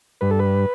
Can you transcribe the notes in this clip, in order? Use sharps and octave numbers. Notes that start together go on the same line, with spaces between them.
G2 B4
A4
B4